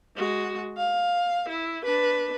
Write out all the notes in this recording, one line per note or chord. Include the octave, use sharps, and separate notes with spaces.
G#3 F#4
F5
E4
D4 B4